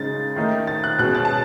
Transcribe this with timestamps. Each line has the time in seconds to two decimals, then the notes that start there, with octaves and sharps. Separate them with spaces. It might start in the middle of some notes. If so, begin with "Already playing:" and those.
Already playing: C#3 G#3 D#4 A6
0.36 D#3 A3 D#4
0.67 A6
0.84 F#6
0.98 B2 G#3 C#4 F#6
1.15 A6
1.25 A5